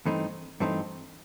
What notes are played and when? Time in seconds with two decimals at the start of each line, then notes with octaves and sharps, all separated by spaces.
0.05 G2 E3 A3 C4 D#4
0.60 G2 E3 A3 C4 D#4